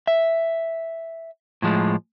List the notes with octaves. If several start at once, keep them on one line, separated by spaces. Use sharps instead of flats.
E5
A2 F3 G#3